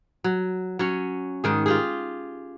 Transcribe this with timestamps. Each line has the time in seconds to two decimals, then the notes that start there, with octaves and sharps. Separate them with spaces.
0.24 F#3
0.79 F#3 C#4
1.44 G#2 D#3 G#4
1.66 F4 G4 G#4